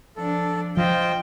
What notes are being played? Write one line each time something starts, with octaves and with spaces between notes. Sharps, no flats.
F3 D4 A4
F3 F4 C5 D#5 G5